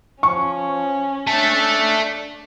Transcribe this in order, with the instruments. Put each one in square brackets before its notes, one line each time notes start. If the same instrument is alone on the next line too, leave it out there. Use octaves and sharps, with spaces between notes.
[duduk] F3 [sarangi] C#4 [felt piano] C#6
[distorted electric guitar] A3 A4 [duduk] D4